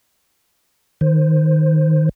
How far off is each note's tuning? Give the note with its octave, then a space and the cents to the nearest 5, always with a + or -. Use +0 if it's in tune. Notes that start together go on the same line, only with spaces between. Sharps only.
D#3 +0 C5 +0